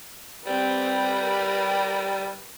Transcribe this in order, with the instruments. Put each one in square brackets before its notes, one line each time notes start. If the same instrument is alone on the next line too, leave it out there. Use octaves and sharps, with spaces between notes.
[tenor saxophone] G3 [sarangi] C4 [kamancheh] G4 B4
[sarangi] A#4